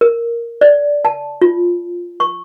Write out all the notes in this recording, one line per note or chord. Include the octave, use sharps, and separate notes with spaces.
A#4
D5
A5
F4
C#6